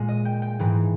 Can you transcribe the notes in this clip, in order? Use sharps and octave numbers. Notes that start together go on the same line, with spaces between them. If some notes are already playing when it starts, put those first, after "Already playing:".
Already playing: A#2 G#3
D#5
G5
G5
G#2 E3 G#3